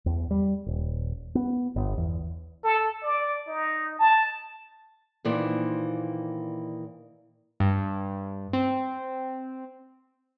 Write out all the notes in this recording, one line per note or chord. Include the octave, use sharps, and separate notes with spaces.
E2
G3
D#1
B3
G1
E2
A4
D5
D#4
A5
A#2 D#3 E3 A#3 C5 D5
G2
C4